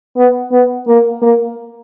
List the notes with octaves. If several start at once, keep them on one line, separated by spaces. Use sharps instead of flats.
B3
B3
A#3
A#3